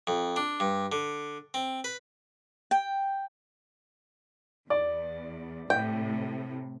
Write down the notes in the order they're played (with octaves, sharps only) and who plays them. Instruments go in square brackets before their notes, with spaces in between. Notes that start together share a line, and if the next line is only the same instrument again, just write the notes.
[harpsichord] F2
D4
G2
D3
C4
B4
[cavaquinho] G5
[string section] E2 [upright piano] D5
[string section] A2 C3 [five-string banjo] G5